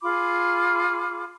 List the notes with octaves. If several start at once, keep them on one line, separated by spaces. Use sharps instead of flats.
F4 G#4 B5 D6